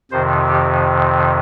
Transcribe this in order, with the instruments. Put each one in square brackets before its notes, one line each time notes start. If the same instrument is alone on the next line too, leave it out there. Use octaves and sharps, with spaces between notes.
[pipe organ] F2 C3 D#3 C5
G4